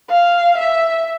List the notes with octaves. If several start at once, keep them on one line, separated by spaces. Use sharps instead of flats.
F5
E5